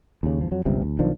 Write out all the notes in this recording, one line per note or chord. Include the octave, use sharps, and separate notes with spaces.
D#2 C#3
G1 E2 F3
F2 F#3
G1 C#2 G2 C3
D2
B1 D#3 F3 D4